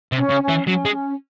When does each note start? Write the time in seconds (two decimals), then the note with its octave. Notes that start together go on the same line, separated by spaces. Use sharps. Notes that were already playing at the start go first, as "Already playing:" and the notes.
0.12 C3
0.18 C#4
0.30 C#3
0.43 C#4
0.49 E3
0.67 F#3 C#4
0.85 G#3
0.92 C#4